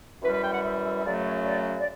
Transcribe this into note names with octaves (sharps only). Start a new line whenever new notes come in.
F#2 E3 G3 B4
B4
G5
F#5
E5
E5
E5
F#2 C#3 F#3 A3 D5
C#5
D5
D5